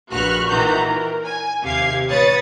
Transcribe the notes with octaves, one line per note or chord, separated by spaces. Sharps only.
A#1 F#4 B4 C#6 F6 F#6
A#2 D#3 E3 F#4 A#5 G6
A#4
G#5
D#2 C3 G4 F5 G#6 C7
A1 B4 C#5 D#6 A6 C#7